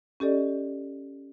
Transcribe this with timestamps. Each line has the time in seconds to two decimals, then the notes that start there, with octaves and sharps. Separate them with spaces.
0.20 C#4 G4 A4 D5 D#5